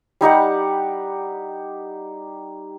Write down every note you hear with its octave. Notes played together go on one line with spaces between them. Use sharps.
G3 D#4 G4 F#5